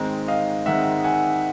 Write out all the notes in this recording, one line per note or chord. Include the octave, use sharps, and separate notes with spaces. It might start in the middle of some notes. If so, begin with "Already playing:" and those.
Already playing: G#2 D#3 G#3 C4
D#5 F5
G#2 D#3 G#3 C4 E5 F#5
F#5 G#5